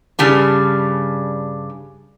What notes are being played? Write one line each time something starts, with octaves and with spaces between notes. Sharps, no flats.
G2 C#3 G3 D4